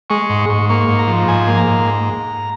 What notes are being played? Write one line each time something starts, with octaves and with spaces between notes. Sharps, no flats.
G#3 C#6
G#2
C#6
G#2
A#3 C#6
G#2
A#5
F3
G#2 G#5
A#3
A#5
G#2